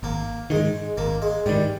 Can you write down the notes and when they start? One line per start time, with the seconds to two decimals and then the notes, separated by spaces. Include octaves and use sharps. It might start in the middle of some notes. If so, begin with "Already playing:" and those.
0.03 G#1 A#3
0.50 G#2 D#3 G#3
0.97 G#1 A#3
1.22 G#3
1.46 G#2 D#3 G3